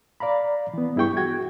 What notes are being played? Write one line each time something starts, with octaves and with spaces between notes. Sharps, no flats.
D5 F5 A#5 B5
E3 B3
G2 E4 G#4 G5 C#6
F#4 G5 G#6